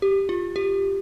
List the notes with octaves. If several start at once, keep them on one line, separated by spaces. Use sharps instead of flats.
G4
F4
G4